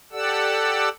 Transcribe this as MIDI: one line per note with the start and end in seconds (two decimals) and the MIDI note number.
0.12 0.89 67
0.12 0.89 69
0.12 0.89 74
0.12 0.89 78
0.12 0.89 88